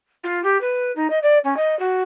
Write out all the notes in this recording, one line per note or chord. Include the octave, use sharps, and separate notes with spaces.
F4
G4
B4
D#4
D#5
D5
C#4
D#5
F#4